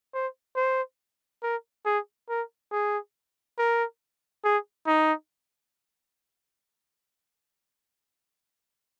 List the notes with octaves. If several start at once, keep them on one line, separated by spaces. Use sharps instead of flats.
C5
C5
A#4
G#4
A#4
G#4
A#4
G#4
D#4